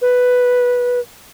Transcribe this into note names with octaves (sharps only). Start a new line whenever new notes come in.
B4